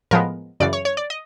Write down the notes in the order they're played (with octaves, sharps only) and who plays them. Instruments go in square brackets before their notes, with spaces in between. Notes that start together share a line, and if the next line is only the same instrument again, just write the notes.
[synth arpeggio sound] A2 F3 G#3 B3 A#4
F#2 C#3 E3 D5
C#5
C#5
D5
D#5